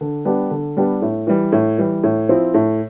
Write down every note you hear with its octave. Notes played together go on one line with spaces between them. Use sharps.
D3
G3 B3 D4 G4
D3
G3 B3 D4 G4
A2
E3 G3
A2
E3 G3
A2
F3 C4 E4
A2